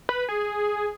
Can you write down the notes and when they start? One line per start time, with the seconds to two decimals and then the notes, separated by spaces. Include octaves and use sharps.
0.09 B4
0.29 G#4